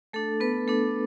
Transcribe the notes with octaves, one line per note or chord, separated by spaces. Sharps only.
A3 D4 A4
B3 B4
A3 D4 A4